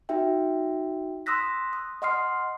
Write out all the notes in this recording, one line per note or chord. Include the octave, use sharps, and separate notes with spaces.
D#4 F#4 E5 G5
C6 D#6 E6 F#6 A#6 B6
D#6
D#5 F#5 C6 D#6 F6 C7